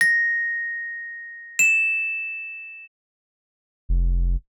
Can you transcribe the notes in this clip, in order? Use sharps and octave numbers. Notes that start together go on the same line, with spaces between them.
A#6
E7
F1